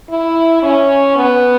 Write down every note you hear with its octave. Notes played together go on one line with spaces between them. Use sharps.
E4
C#4
B3